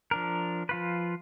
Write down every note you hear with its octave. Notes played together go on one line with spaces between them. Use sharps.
F3 D4 A#4
F3 F4 B4